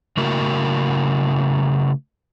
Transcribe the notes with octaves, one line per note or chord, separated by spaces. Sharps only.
C#3 A3 E4 F#4 A#4